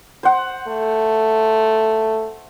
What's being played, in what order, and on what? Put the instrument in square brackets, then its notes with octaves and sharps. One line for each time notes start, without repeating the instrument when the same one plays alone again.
[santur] C5 F#5
[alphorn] A3